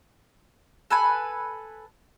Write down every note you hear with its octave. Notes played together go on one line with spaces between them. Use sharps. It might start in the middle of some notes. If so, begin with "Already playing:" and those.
A4 B4 G#5